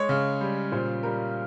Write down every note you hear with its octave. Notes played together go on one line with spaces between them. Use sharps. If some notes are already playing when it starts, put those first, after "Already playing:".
Already playing: G#3 C#5
C#3
G3
A#2 C5
G3 A#4